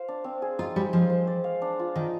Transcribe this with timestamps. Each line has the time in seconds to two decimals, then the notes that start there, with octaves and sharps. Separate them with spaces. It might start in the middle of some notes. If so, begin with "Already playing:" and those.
Already playing: C5 F5
0.08 D4
0.24 C4
0.42 G#4
0.59 D#4 F4
0.76 G3 D#4
0.93 F3 G#3
1.10 C5
1.27 D5
1.44 F5
1.62 D4
1.79 F4
1.96 D#3 D#4